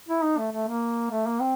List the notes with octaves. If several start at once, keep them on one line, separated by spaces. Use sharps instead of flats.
E4
D#4
A3
A3
A#3
A3
A#3
C4